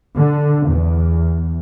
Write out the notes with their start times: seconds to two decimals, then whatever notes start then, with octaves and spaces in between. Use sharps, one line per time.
0.15 D3
0.66 E2